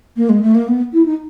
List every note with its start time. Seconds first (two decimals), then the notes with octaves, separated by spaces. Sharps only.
0.17 A#3
0.29 G#3
0.42 A3
0.55 A#3
0.68 B3
0.93 E4
1.06 D#4